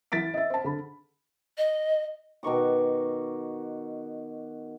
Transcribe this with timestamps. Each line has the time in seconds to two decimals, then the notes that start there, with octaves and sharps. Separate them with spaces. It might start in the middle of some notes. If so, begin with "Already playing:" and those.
0.12 E3 A6 B6 D7
0.34 D#5 E5
0.50 C5 A5
0.64 D3 B5
1.58 D#5
2.43 B2 D#3 C#6 D6